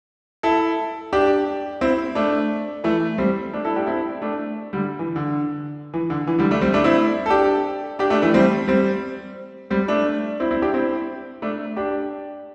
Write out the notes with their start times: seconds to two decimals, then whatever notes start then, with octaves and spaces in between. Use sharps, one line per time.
0.43 E4 A4
1.13 D4 G4
1.81 C4 E4
2.15 A3 D4
2.84 E3 A3
3.18 G3 C4
3.53 A3 D4
3.65 E4 A4
3.76 D4 G4
3.87 C4 E4
4.22 A3 D4
4.73 D3 G3
4.99 E3
5.16 D3
5.94 E3
6.10 D3
6.27 E3
6.38 D3 G3
6.51 A3 D4
6.61 G3 C4
6.74 A3 D4
6.84 C4 E4
7.26 A4
7.30 D4 G4
7.99 D4 G4
8.10 A3 D4
8.22 E3 A3
8.34 G3 C4
8.67 G3 C4
9.70 G3 C4
9.88 A3 D4
10.40 C4 E4
10.51 C4 E4
10.62 D4 G4
10.74 C4 E4
11.42 A3 D4
11.76 D4 G4